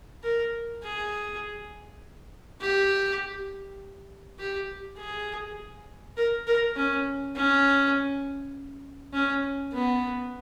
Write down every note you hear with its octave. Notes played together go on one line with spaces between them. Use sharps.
A#4
G#4
G4
G4
G#4
A#4
A#4
C#4
C#4
C#4
B3